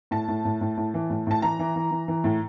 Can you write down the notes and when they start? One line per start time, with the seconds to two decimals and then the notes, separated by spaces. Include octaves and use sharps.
0.11 A2 A5
0.28 A2
0.45 A2
0.61 A2
0.77 A2
0.94 E3
1.10 A2
1.27 A2 A5
1.42 E3 A#5
1.59 E3
1.76 E3
1.91 E3
2.08 E3
2.24 A2